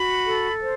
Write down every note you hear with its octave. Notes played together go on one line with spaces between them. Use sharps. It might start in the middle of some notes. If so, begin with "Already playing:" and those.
Already playing: F#4 B5
A4
C5